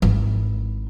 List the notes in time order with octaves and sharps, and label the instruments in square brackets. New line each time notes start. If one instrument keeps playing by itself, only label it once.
[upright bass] G#1 E3